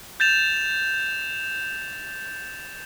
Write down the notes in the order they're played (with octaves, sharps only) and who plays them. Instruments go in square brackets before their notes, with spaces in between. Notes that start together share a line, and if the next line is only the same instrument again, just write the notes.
[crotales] G6 A6 E7 F7